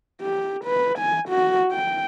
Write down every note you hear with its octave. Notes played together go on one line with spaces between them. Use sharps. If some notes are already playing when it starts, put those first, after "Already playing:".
G4
B4
G#5
F#4
G5